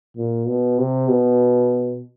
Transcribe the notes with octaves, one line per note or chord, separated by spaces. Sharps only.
A#2
B2
C3
B2